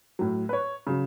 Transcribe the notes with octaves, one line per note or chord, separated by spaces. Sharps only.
A2 F#3
B4
C#5
C#3 F#3